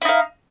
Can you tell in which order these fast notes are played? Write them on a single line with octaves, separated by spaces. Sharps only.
E4 D#4 F5